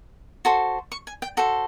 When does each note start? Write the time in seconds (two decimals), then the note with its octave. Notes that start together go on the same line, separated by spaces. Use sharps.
0.45 F#4 A4 C5 C6
0.92 C#6
1.07 G#5
1.22 G5
1.37 F#4 A4 C5